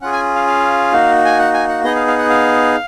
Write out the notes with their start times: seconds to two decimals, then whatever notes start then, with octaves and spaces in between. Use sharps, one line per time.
0.01 C#4 F4 G#4 F#5
0.13 G#5
0.35 F5
0.47 F5
0.93 A#3 D#4 F#4
1.25 G#5
1.39 F#5
1.54 G#5
1.69 F#5
1.84 B3 D#4 G#4 D#5
1.96 F5
2.07 F5
2.18 F#5
2.30 F5